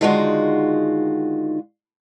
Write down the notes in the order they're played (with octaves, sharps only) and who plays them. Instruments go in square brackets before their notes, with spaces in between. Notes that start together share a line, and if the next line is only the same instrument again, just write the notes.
[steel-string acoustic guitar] D3 D#3 G#3 D#4 F4 F#4